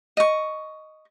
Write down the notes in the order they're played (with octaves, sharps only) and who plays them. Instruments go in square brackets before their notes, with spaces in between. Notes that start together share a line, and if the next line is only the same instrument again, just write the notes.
[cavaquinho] D#5 C#6